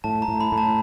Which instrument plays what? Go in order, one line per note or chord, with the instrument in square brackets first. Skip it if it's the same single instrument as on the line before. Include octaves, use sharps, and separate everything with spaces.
[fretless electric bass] A2 [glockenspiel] A5
[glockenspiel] A#5
[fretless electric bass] A2
[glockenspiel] B5
[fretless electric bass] A2
[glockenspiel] A5